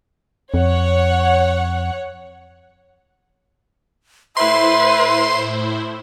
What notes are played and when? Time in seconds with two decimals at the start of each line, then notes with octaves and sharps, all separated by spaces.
0.54 F2 C#5 F#5
4.37 A2 E4 B4 C5 E5 C6